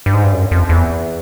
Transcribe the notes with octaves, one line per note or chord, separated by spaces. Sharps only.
G2
G#2
G2
F#2
F2
E2